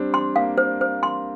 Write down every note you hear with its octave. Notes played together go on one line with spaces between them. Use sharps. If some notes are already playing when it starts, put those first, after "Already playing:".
Already playing: G3 C4 D4
C6
A#3 F5
C5
A#3 C5
C6